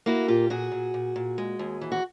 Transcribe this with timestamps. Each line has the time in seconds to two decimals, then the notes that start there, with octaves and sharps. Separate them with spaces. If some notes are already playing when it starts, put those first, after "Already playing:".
0.06 A#3 E4 F#4
0.28 A#2 F4 G4
0.50 A#2 F#4 G#4
0.72 A#2
0.94 A#2
1.16 A#2
1.38 G#3
1.59 D#2
1.81 E3
1.92 F#4